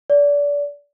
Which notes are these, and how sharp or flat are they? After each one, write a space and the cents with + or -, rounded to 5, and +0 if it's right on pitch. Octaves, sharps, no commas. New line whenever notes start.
D5 -30